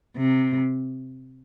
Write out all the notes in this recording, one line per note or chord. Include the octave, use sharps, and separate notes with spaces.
C3